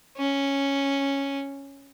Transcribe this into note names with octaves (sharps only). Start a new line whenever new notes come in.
C#4